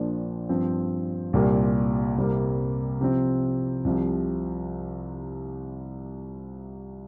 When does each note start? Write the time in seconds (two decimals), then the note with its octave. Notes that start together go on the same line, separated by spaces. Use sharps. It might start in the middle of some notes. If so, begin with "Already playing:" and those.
Already playing: A#1 A#2 F3 D4
0.49 G2 F3 C4
1.33 C2 A#2 G3 A#3 G4
2.17 C2 C3 G3 A#3
3.01 C3 F3 C4
3.84 C2 C3 F3